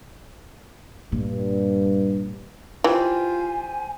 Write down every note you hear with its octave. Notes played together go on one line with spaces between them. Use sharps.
G2 A#2
E3 F4 G4 C5 G#5